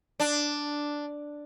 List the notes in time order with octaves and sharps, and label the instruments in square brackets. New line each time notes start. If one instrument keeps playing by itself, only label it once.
[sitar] D4